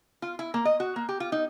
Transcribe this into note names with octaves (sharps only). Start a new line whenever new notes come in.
F4
E4
A#3
D#5
F#4
A#3
G4
F4
D#4